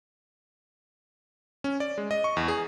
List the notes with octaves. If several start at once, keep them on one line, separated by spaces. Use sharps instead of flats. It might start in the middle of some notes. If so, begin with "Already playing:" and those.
C#4
D5
G#3
D#5
C#6
E2
G#4